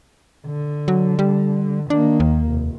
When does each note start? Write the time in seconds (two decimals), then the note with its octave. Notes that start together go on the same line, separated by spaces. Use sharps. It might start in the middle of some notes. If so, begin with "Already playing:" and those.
0.47 D3
0.88 F#3
1.19 G3
1.90 D#3 A#3 D4
2.20 D#2
2.49 F1